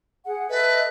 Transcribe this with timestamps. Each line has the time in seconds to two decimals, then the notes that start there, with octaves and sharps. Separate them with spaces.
0.26 G#4 F#5
0.49 A4 B4 D#5 E5